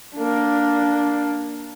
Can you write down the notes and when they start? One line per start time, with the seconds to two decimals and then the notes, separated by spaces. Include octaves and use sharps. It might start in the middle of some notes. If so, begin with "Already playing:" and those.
0.16 A#3 D4